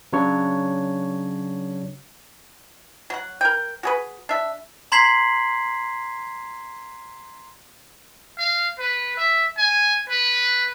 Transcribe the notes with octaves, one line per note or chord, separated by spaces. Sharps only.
C#3 F#3 D4 C#5 C#6
F#3 F#5
A#4 G5
F#4 G#4 B4
D4 E5
A#5 C6 G#6 B6 C7 F#7
F5
B4
E5
G#5
B4